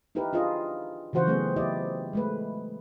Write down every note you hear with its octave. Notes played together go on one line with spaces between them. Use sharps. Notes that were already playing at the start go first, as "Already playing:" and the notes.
D#4 E4 G4 A#4 B4
D4 F4 G#4 D#5
C#3 E3 F#4 C5 F#5
F#3 A3 B3 C4 G#4
E4 G4 D5 D#5
G#3 A3 B4